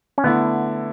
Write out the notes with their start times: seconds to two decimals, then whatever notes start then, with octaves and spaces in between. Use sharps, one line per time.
0.18 C#4
0.24 D3 A3 B3 E4